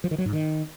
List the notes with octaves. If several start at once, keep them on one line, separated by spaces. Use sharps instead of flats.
F3
D#3
F#3
G#2
D#3